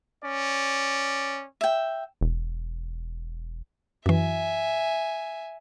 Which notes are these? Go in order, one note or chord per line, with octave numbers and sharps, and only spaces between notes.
C#4 D5
E5 G5
E1
F#2 E3 E5 G#5